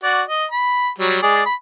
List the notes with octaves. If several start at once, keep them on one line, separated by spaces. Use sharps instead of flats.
F#4 D5
D#5
B5
F#3 G3
G#3 G#4 D5
B5